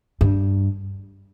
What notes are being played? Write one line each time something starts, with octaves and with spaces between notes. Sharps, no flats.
G2